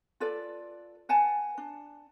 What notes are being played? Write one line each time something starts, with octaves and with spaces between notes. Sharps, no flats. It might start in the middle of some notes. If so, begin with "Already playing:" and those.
F4 A4 B4 D5
B4 F#5 G#5 A5
D4